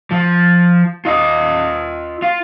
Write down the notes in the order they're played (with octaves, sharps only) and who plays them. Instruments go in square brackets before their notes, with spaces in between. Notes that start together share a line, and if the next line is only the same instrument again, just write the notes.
[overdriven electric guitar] F3
F4 D#5
F4